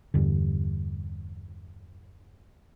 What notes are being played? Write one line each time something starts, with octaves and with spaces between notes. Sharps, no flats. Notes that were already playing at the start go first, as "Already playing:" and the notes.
E2 G2 D3